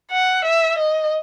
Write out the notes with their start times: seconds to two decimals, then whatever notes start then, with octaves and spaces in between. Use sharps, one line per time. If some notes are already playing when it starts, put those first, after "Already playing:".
0.11 F#5
0.45 E5
0.79 D#5